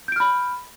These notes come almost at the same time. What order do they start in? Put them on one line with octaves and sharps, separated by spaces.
G6 D7 F6 B5